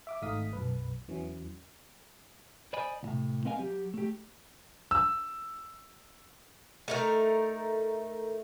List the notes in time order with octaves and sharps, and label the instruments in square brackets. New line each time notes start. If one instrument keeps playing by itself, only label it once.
[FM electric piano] E5 D6
G#1 A3 D#4 F5 D#6 B6
B1 F#2 B4
E2 E3 F#3 C#4
[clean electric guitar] C5 D5 D#5 G#5 B5
C#2 A2 C3
B3 C4 A#4 D#5 F5 G#5
F#3 G4
A3 G4
[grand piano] E6
[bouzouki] A3 D#4 A#4